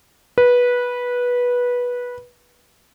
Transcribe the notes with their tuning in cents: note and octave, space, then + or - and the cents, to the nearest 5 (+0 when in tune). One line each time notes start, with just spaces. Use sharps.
B4 -15